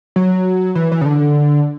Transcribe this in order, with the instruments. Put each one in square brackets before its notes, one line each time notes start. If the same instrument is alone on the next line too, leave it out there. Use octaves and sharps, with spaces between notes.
[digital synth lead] F#3
E3
E3
C#3
D3